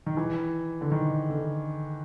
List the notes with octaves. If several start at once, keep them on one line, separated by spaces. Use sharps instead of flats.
D#3
E3
D3
D#3
D3